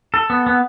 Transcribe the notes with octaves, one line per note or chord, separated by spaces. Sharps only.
A4
B3
B3